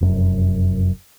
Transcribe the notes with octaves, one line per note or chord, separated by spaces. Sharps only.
F1 F#2